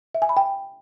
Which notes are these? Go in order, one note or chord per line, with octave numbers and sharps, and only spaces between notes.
E5
G#5
B5
G5